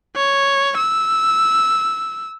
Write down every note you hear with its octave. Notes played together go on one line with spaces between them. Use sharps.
C#5
E6